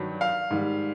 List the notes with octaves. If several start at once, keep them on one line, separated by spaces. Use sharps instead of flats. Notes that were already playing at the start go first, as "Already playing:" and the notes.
Already playing: G2 D#3 F#3
F5
G#2 D#3 G3